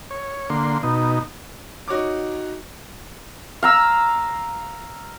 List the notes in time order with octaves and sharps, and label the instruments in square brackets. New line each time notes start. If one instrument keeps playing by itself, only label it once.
[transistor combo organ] C#5
D3 A#3 C6
B2 D#4
[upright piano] D#4 F#4 C#5 D6
[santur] F5 A#5 E6